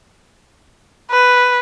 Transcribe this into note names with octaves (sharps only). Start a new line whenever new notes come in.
B4